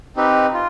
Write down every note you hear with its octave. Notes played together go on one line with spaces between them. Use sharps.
C4 D#4 G4 B4
F4